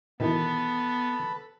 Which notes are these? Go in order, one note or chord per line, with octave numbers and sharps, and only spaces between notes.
B2 D#3 E3 B3 A4 B4